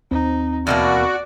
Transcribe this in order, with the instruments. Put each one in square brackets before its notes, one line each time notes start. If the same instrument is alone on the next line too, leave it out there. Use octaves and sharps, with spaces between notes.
[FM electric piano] D#2 C4 [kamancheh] D#4
[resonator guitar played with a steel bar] E2 B2 A#3 [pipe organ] F#4 [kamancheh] D5